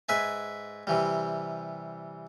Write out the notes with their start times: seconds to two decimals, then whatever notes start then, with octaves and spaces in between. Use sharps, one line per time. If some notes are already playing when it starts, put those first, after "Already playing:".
0.09 G#2 B4 E5 G#5
0.87 C3 E3 G3